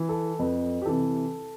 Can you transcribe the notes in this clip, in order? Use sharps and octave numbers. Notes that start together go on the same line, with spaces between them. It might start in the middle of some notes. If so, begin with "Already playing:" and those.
Already playing: E3
A4
F2 B4
G4
C3 E3 A4